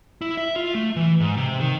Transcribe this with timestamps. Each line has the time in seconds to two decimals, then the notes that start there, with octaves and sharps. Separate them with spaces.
0.22 E4
0.37 E5
0.56 F4
0.75 A3
0.96 E3
1.20 G#2
1.37 C3
1.60 D#3